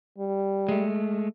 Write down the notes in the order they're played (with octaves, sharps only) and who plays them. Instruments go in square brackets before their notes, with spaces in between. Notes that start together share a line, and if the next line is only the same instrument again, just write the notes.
[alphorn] G3
[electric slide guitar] G#3 A3